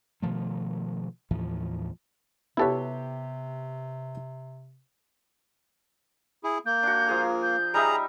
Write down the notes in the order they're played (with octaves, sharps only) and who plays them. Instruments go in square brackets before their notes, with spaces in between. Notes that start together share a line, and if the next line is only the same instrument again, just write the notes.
[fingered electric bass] B2 D#3 F3 A3
D#2 A2 E3 F3
[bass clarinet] C3 [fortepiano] B3 G4 C#5 [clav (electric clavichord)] E4 A4 B4
[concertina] E4 G#4
[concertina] A#3 [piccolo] G6
[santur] D4 F#4
F3 G#4 A#5
[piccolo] G6
[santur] G3 D#4 E5 [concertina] G#4 A#5